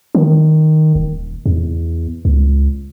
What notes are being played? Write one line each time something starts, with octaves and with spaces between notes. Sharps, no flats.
D#3
D#1
E2
C#2